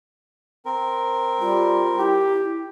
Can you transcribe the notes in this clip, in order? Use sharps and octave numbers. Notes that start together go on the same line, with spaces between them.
C4 A#4
G3 F4
E4 G4